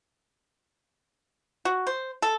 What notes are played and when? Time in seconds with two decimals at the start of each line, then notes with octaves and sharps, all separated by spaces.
1.65 F#4
1.87 C5
2.22 A4